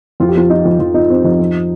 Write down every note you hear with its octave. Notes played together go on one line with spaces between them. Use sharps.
F2 F4
G4
F3 F4
F3 D#4
F2 F4
F2 F4
F3 D#4
F3 C4
F2 D#4
F3